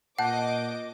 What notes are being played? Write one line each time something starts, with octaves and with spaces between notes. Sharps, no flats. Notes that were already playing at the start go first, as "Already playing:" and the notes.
A#2 D#5 F#5 A5 D6 F#6 G6